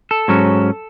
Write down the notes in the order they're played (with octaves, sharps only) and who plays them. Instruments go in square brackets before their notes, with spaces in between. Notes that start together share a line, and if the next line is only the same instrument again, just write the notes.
[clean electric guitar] A4
G#2 F#3 C#4